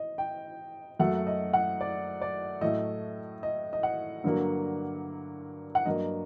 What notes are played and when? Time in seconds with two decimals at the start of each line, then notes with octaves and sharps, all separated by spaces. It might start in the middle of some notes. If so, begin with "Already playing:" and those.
Already playing: D#5
0.18 G5
0.99 F#2 F#3 A3 F#5
1.27 D#5
1.53 F#5
1.81 D5
2.21 D5
2.61 A2 F#3 A3 D#5
3.43 D#5
3.73 D#5
3.83 F#5
4.24 G2 D3 F#3 A#3
5.75 F#5
5.86 G2 F#3 A#3 D#5